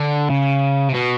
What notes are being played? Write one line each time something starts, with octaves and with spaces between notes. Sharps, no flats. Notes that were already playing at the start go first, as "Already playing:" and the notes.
Already playing: D3
C#3
C3
B2